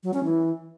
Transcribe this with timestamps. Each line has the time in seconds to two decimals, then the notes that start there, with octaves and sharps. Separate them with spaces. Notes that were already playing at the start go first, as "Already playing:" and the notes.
0.03 F#3
0.14 C#4
0.24 E3